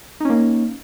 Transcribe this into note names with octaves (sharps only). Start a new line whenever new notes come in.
A#3 C#4 D#4